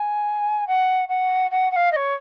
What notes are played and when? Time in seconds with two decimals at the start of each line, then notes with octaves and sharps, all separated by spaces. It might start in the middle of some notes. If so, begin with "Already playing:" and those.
Already playing: G#5
0.67 F#5
1.08 F#5
1.51 F#5
1.71 F#5
1.76 F5
1.92 D#5
1.96 C#5